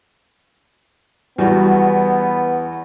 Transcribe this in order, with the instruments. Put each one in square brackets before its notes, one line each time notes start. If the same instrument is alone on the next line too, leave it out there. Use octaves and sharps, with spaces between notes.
[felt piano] E2 F#4 [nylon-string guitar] G3 [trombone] B3